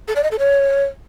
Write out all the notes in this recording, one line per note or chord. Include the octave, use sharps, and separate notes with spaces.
A4
D5
D#5
A4
C#5